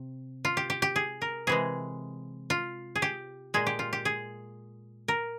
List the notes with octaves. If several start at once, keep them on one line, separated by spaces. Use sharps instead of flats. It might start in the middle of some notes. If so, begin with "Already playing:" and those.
Already playing: C3
F4
G4
G4
G4
G#4
A#4
C3 E3 G#3 G#4
F4
G#4
G4
A#2 G#3 G#4
G4
F4
G4
G#4
A#4